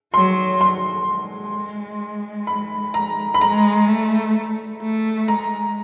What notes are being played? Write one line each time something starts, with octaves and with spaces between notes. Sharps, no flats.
F#3 C6
C6
G#3
B5
A#5
B5
G#3 A#5
A3
A3
G#3 A#5